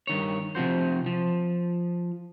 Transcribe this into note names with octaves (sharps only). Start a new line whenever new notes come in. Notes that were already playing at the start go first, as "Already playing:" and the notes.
G2 D#3 C#5
C3 F3 F#4 C5
F3